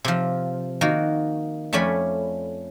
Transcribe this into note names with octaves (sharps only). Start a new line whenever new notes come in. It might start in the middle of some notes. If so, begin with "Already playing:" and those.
C3 F3
D#3 A#3 F#4
F2 A3 C#4 D5 G#5 B5